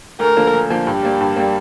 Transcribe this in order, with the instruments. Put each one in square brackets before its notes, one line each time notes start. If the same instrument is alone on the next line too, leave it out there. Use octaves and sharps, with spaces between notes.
[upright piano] D2 [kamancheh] A#4
[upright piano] D3 F3 A#3
D2
D3 F3 A#3
[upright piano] G2 [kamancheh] G4
[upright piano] G3 A#3
G2
G3 A#3